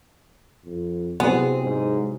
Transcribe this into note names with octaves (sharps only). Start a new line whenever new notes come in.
F2
C3 F#3 B3 C4 E4 G#4
G#2